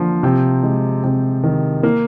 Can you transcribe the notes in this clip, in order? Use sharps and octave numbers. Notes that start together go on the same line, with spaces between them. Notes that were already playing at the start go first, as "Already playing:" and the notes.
Already playing: D3 F3 A#3
C3 G5
G#3
C3 G5
D#3
A#3